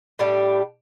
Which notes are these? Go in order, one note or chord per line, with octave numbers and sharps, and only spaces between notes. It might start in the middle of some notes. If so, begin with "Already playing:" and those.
A2 G3 D4 G4